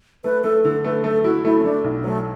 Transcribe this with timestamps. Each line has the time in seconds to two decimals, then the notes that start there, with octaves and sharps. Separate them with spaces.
0.24 A3 B4
0.44 A3 A4
0.64 D3 A4
0.84 A3 B4
1.04 A3 A4
1.24 E4 F#4
1.44 A3 E4
1.59 C#4
1.64 A3 D4
1.84 B1
2.04 F#3 A3